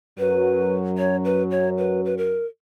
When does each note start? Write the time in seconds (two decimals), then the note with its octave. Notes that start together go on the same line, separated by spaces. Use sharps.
0.18 F#2 F#3 B4
0.98 C#5
1.25 B4
1.51 C#5
1.78 B4
2.05 B4
2.17 A#4